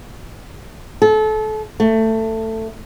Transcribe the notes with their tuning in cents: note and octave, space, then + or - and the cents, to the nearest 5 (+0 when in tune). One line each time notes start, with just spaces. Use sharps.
A4 -30
A3 +15